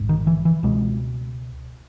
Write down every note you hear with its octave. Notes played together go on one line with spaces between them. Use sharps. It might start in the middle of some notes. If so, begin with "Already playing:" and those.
Already playing: A#1 G#2
D#3
E3
E3
C#2 B2 G#3